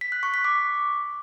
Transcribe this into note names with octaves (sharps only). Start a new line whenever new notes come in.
B6
F#6
C#6
B6
D6